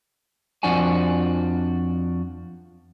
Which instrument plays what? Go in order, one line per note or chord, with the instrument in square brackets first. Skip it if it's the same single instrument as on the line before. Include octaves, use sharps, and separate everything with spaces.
[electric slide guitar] F2 F3 D4 F#4 G#5